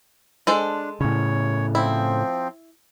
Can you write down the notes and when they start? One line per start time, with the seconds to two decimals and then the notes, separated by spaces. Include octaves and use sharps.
0.47 G#3 D4 A4 C5
1.01 A2 C#3 C#5
1.75 F3 C4 E4